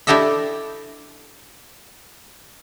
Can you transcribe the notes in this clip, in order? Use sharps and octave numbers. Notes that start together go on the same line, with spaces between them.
D4 E4 G4 A4 D#5 E5